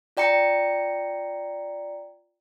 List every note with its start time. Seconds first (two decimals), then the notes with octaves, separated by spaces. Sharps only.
0.17 F4 D5 G5 A#5 C#7